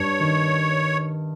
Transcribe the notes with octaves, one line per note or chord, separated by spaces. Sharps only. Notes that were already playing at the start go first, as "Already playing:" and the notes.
Already playing: G2 C#5
D#3